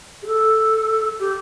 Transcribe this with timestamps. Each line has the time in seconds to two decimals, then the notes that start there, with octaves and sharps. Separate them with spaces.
0.23 G#4
0.27 A4
1.19 G4